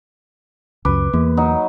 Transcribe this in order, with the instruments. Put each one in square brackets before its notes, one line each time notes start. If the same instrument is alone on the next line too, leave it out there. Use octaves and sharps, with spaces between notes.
[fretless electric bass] C#2 F#2 [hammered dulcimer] B4 [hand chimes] D6
[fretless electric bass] E2 [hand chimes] A#3
[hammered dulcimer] F#3 D#4